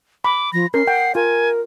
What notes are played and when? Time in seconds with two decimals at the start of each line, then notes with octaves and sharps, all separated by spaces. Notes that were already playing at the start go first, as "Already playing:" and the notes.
0.24 B5 D6
0.53 F3 A#6
0.74 C#4 A#4 C7
0.87 F#5 G5
1.15 F4 A#4 G#5